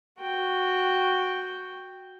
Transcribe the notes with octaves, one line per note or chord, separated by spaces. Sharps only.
F#4 G5